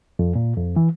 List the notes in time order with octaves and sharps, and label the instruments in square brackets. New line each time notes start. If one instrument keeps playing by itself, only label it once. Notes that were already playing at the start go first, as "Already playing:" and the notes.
[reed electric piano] F2
A#2
F2
E3